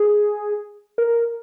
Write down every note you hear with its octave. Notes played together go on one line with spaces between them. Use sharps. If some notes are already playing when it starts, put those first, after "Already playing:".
Already playing: G#4
A#4